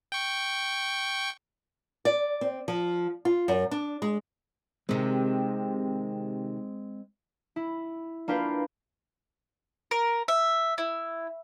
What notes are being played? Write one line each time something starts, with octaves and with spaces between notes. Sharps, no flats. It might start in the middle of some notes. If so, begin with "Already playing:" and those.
G5 C#6
D5
C4
F3
F4
F#2
D4
G#3
C3 D#3 G#3 C4
E4
A#3 D4 F4 B4 G5
A#4
E5
E4